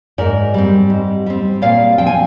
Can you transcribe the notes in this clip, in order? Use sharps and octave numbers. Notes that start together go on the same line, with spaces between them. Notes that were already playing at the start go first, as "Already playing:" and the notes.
G#2 A#4 D5
G3 C4
G#2
G3 C4
A#2 D5 F5
F3 C4 G5
G#5